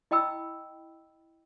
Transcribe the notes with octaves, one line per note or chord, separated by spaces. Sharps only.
E4 D#5 G5 B5 E6